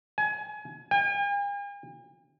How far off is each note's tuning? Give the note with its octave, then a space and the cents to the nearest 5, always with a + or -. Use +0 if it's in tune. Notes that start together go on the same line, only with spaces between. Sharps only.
G#5 +30
G#5 -45